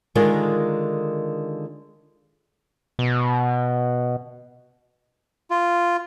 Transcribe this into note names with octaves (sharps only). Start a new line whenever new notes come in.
D3 D#3 G#3 F4 A#4
B2
F4